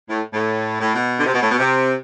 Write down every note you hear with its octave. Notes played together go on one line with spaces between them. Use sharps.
A2
A2
A2
B2
D3
C3
B2
A2
B2
C3